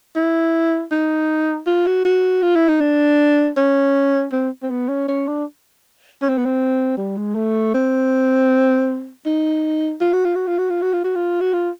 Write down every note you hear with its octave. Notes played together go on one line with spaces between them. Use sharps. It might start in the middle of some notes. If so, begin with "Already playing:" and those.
E4
D#4
F4
F#4
F#4
F4
E4
D#4
D4
C#4
C4
C4
B3
C#4
C#4
D4
C#4
C4
B3
C4
G3
G#3
A3
C4
D#4
F4
F#4
F4
F#4
F4
F#4
F4
F#4
F4
F#4
F4
F#4
F4